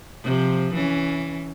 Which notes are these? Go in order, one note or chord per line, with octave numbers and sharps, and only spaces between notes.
C3 F3
E3 C#4